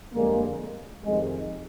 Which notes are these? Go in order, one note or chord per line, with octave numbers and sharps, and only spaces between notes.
F2 D3 G3 G#3 A#3
F2 C3 D#3 G#3